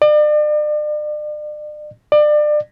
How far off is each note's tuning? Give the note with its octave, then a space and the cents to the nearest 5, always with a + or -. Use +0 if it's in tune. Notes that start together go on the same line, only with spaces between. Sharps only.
D5 +40
D5 +30